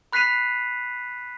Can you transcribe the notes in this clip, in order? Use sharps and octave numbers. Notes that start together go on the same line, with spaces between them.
B5 F#6 B6 C7 D#7 F7